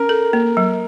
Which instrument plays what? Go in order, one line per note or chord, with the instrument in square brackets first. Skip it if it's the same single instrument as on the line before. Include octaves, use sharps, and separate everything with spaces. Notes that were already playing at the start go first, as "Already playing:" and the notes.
Already playing: [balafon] C#4 [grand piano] A#4
[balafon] A4
A#3
F#3